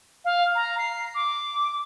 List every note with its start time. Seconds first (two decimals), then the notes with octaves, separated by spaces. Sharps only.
0.24 F5
0.55 A#5
0.78 C7
1.14 D6